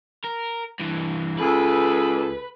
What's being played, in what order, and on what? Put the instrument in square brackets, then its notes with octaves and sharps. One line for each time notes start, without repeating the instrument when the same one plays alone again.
[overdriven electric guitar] A#4
G2 E3
[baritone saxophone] C#2 [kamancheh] G#4 A4 [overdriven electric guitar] B4